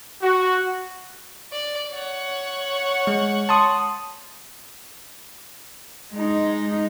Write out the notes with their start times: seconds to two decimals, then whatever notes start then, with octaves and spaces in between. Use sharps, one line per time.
0.22 F#4
1.52 D5
1.93 C#5 F#5
3.07 G#3
3.49 A5 C6 D#6
6.13 G#3 D#4